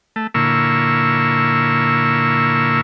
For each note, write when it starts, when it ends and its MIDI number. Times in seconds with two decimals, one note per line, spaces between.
0.16 0.27 57
0.34 2.81 46
0.34 2.81 50
0.34 2.81 58
0.34 2.81 64
0.34 2.81 85
0.34 2.81 88